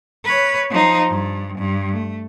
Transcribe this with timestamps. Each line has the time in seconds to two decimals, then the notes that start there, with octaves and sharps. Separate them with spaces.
0.24 B4 C#5
0.70 F3 D#4
1.09 G2
1.58 G2
1.92 A3